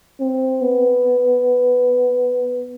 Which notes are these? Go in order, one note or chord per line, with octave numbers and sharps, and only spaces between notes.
C4
B3